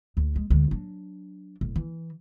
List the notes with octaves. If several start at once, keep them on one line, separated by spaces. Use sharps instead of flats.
D2
G#3
D2 G#3
F#3 D4
E1
E3